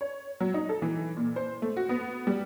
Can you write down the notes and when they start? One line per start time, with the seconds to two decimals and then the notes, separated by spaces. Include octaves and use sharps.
0.01 C#5
0.40 F#3
0.54 D#4
0.69 A4
0.82 E3
1.17 A#2
1.36 C5
1.62 A3
1.77 F#4
1.89 B3
2.27 G3